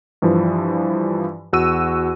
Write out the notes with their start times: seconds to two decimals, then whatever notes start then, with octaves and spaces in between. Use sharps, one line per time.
0.22 G2 E3 F3
1.53 E2 F#4 E6 D#7